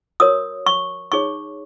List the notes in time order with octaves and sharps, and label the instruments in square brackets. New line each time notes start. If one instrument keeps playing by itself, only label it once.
[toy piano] F#4 A#4 C#5 D#6
C#6
D#4 G#4 C#5 C#6